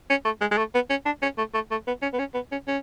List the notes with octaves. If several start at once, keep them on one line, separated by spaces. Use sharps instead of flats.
C#4
A3
G#3
G#3
A3
B3
C#4
D4
C#4
A3
A3
A3
B3
C#4
B3
C#4
B3
C#4
C#4